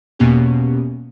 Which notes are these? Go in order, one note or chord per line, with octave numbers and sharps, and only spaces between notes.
E2 B2 A#3 B3 C#4 G4